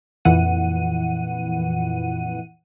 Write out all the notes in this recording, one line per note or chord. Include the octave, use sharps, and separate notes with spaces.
F2 A#2 E3 F#5 D#7